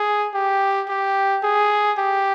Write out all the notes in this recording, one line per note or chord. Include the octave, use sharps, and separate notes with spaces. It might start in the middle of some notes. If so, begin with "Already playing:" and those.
Already playing: G#4
G4
G4
G#4
G4